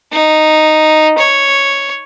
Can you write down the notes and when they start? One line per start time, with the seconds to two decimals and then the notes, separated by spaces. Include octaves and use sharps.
0.12 D#4
1.18 C#5